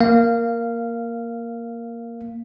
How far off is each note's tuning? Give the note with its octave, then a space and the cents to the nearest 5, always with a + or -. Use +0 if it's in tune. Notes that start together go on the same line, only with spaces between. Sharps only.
A#3 +0 F5 -15